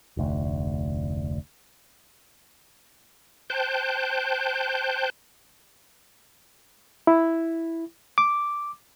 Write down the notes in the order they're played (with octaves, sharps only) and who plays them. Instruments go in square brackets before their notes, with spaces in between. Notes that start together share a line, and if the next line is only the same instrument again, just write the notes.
[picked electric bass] F1 D2
[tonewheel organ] C5 G5 A5 F#6 G6
[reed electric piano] E4
D6